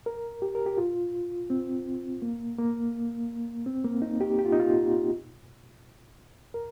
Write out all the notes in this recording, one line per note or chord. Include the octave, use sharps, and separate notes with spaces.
A#4
G4
A#4
G4
F4
C4
A#3
A#3
C4
A#3
D#4
G4
G4
F4
D#4
F4
A#4